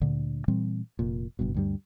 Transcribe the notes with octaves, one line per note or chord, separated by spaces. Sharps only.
D2 A#2 D3
A#2 E3 G3 C4
F1 A#2
F#1 G2 B2
D2 G2 G3